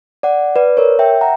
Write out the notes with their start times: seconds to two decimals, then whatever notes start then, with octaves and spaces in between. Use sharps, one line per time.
0.23 D5 F#5
0.56 B4 D5
0.77 A#4 C#5
0.99 E5 G5
1.21 F#5 A#5